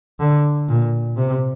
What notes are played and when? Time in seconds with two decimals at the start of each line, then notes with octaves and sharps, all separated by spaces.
0.20 D3
0.69 A#2
1.17 C3